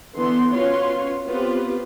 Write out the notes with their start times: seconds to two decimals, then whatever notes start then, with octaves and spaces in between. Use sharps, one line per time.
0.17 D3 E3 B3 C6
0.53 C#4 F4 F#4 B4 C#5 C6
1.25 B3 C4 F4 G4 B4 C5